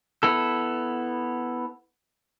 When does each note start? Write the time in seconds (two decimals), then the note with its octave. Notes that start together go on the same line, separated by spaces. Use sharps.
0.23 B3 E4 A4